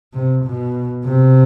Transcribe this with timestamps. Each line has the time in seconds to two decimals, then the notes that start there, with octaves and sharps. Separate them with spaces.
0.13 C3
0.45 B2
1.05 C3